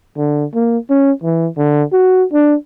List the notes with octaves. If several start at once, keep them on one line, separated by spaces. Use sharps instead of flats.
D3
A#3
C#4
E3
D3
F#4
D4